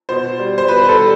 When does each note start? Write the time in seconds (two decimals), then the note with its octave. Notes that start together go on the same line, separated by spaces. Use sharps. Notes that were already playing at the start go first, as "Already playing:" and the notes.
0.09 B2 C5
0.39 G3
0.58 C5
0.68 B2 B4
0.84 B4
0.89 A4
0.99 G3